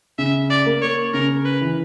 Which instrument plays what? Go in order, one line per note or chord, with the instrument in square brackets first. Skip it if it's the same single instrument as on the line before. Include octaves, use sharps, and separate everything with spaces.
[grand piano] C#3 [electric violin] E5
[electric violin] D5
[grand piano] A#3
[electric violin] C#5
[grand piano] C#3 [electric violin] A#4
[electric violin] B4
[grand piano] E3